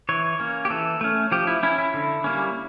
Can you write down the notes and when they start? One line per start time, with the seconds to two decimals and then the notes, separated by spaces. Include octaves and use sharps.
0.09 E3 C#5
0.40 A#3 C#4
0.65 G4
0.70 E3 A4
1.01 A3 C#4
1.32 F3 G4
1.47 E4
1.63 C#4 E4
1.78 E4
1.94 D3
2.24 G3 A#3 C#4